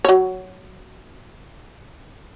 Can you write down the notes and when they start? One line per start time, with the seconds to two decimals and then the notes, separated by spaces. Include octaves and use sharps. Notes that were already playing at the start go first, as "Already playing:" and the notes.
0.05 F#3 C#5